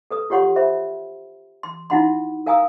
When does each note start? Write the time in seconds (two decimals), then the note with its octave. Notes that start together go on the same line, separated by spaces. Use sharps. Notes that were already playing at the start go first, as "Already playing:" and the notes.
0.11 A4 B4 D#6
0.30 F4 G4 C#5 F#5 C6 C#6
0.56 C5 E5 B5
1.63 C6
1.90 D#4 E4 F#4 F#5 B5 C6
2.46 A#4 F5 G#5 A#5 D#6 E6